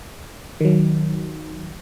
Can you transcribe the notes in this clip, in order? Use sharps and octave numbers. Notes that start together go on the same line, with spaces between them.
D#3 F#3